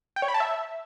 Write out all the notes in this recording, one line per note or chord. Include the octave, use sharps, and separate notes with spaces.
G5
C#5
B5
A5
E5